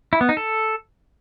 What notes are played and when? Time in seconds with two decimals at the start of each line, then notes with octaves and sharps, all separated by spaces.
0.13 E4
0.21 B3
0.29 D#4
0.37 A4